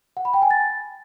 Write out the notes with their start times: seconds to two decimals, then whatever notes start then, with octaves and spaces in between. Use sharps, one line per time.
0.17 F#5
0.25 B5
0.34 G5
0.42 G#5
0.51 A6